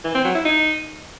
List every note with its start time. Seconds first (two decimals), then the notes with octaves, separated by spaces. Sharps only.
0.04 E3
0.15 C4
0.25 F#3
0.35 E4
0.45 D#4